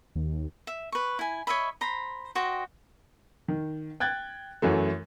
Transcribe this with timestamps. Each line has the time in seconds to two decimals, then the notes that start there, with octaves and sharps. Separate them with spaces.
0.16 D#2
0.67 E5
0.92 B4 C#6
1.19 E4 G#5
1.47 C#5 D#5 E5 B5
1.81 C5 A#5 B5
2.35 F#4 C5 D#5 G5
3.48 D#3
4.00 G5 F#6 G#6 A6
4.62 F#2 E3 F#3 A3